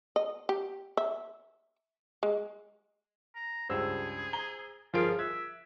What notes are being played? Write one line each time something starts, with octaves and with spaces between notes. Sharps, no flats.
D#5
G4
E5
G#3
A#5
C#2 G2 G#4 C5 E6
A#5 G7
G1 F3 F4 G#4 A#4 F5 D7
E5 F#6 G#6